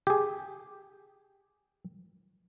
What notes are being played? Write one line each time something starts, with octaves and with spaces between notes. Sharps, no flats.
G4 G#4